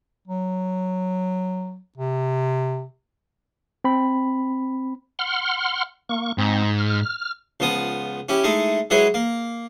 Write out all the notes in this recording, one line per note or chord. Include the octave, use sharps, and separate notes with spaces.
F#3
C3
C4 B5
F#5 C6 F6
A#3 C#6
G#2 C4
F6
C#2 F3 B3 D#6
C#4 E4 G4
G#3 A3 D#4 E4
F#3 G#3 E4 G#4 B4 C#5
A#3